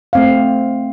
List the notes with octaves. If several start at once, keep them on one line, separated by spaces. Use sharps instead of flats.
A3 C4 F5